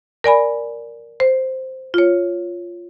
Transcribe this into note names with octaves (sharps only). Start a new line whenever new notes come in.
A#4 D5 G#5 B5
C5
F4 C#5